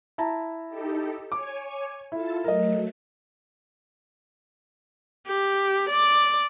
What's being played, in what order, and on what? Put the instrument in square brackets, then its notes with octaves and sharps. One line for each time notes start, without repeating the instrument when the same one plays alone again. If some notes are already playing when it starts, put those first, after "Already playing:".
[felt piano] E4 A5 A#5
[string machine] D#4 G4 A4
[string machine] C#5 G#5 [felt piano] D6
[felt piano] E4 [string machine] F4 A4 A5
[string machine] F#3 A3 [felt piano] A#4 D#5
[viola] G4
D5